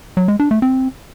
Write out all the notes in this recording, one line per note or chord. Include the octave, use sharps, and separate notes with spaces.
F#3
G#3
D4
A3
C4